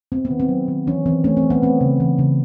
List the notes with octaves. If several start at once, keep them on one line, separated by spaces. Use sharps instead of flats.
B3 C4
B3
D#3
C4
F#3
D#3
E3 C#4
E3 C4
A3 C#4
C4
E3
B3
A3 C4
C#3
E3
C#3